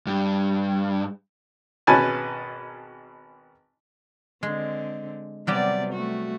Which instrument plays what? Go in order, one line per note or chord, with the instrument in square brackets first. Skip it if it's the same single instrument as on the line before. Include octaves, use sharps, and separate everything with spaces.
[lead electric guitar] G2
[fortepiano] G#1 B2 C#4 B4 G#5 A5
[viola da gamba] D3 C4 [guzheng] G#3
[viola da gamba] C3 B3 D5 [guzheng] F#3 G3 G4
[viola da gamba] A3 F#4